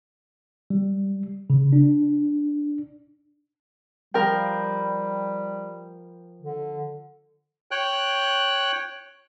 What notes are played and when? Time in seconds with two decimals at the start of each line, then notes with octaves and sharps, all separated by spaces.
0.70 G3
1.50 C#3
1.73 D4
4.14 F3 G3 A#4 G5
6.42 D3
7.71 C#5 G5 F#6